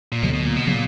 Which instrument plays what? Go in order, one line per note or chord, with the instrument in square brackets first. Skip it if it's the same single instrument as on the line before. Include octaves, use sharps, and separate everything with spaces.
[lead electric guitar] A#2
[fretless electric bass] D2 D3 F#3 [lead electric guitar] B2
[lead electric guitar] B2
A#2
B2
[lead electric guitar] A#2 [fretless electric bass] C#3 F#3 B3